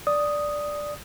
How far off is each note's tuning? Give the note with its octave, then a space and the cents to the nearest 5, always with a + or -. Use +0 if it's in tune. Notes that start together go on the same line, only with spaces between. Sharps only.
D5 +0 D#6 +0